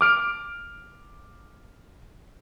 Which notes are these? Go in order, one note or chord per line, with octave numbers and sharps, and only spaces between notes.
D6 F6 D7